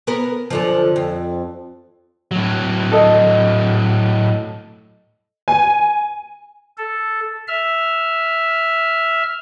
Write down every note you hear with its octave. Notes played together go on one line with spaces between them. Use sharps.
B3 A#4
F#2 D3 F3
F2
A2 F#3
A4 D#5
G#5
A4
E5 F6